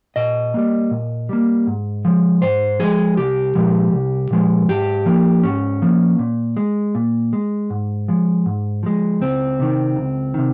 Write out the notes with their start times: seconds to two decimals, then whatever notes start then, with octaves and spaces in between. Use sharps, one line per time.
0.16 A#2 D#5
0.54 G3 A#3
0.91 A#2
1.29 G3 A#3
1.67 G#2
2.05 F3 G#3
2.42 G#2 C5
2.80 F3 G#3 G#4
3.17 C2 G4
3.55 A#2 F3 G#3
3.93 C2
4.31 A#2 F3 G#3
4.69 G#2 G4
5.06 F3 A#3
5.43 G#2 C#4
5.82 F3 A#3
6.19 A#2
6.57 G#3
6.95 A#2
7.33 G#3
7.70 G#2
8.08 F3 G#3
8.46 G#2
8.83 F3 G#3
9.21 C#2 C4
9.60 C3 D#3
9.96 C#2
10.34 C3 D#3